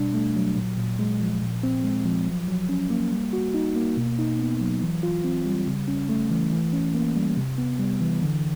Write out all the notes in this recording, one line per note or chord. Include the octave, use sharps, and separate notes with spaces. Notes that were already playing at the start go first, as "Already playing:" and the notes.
Already playing: B2 G3 D4
A3
F#3
A#2
A#2
G#3
F3
A#2
C4
G#3
F3
F#3
F#3
C#4
A#3
G3
F#4
D#4
A#3
B2
D#4
B3
F#3
E3
F4
C4
G3
C#3
C#4
A3
E3
E3
C#4
A#3
G3
C3
B3
G3
E3
D3